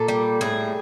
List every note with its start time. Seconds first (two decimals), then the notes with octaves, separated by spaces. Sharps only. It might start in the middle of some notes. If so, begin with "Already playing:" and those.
Already playing: A#2 A4
0.08 G3
0.41 A2 G#4